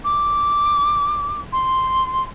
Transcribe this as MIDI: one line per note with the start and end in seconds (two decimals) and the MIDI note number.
0.04 1.40 86
1.52 2.25 84